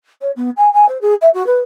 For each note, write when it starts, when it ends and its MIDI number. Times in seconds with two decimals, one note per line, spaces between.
0.21 0.31 73
0.36 0.50 59
0.57 0.73 80
0.73 0.88 80
0.89 0.98 72
1.01 1.14 68
1.21 1.30 76
1.34 1.45 66
1.46 1.60 71